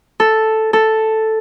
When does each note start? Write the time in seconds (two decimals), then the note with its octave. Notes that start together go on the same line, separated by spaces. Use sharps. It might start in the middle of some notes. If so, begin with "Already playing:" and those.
0.20 A4
0.73 A4